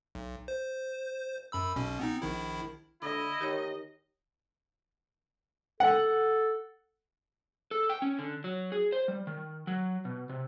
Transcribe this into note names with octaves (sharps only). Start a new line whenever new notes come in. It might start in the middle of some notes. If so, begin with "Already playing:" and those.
B1
C5
F#2 B5 E6
B1 B2 C#4
B3 C4 D#4
A#1 D#3 E4
D3 E4 D#5 B5
D#3 G4 C#5
A4 F#5
A4
G5
C#4
D3
F#3
G#4
C5
G3
D#3
F#3
B2
C3